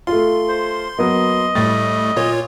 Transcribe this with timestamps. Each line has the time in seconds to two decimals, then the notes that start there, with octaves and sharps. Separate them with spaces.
0.07 A3 F4 C6
0.48 C5
0.99 F#3 A#3 B3 D#5
1.55 A2 G3 A3 A6
2.16 A#2 F4 C#5